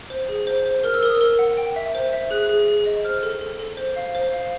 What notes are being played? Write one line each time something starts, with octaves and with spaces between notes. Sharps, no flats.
C5
G#4
C5
C5
A#4 F6
E6
A#4 D#6
E6
A#4
F#5
G5
E5
C5
E5
G#4 F#6
G#4
G#4
D#5
C5 F6
A4
A4
A4
C5
F5
C5
F5